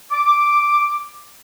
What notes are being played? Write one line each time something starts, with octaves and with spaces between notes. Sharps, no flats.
D6